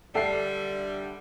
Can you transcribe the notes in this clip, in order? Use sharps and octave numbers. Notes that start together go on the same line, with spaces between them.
D3 G3 A4 E5 F#5 C7